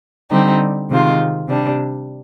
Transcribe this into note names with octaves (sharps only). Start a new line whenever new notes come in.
D3 G3 C4 D#4 G4
C3 D#3 G#3 C4 F4
C3 G3 D4